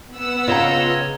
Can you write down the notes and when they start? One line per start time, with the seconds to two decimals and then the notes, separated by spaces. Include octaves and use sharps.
0.13 B3 F#5 E6
0.48 C#3 F4 C#5 D#5 G5 A#5